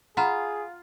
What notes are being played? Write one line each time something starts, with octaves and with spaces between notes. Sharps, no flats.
F4 G#4 F#5 A#5 B5